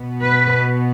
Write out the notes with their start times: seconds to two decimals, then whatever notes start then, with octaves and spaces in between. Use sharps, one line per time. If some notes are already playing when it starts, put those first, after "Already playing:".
Already playing: B2 B3
0.24 B4